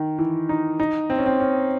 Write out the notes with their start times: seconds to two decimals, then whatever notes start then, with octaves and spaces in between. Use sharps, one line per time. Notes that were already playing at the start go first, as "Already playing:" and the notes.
Already playing: D#3
0.19 E3
0.49 D#4
0.80 D#4
1.10 C4
1.18 C#4
1.26 C4
1.40 C#4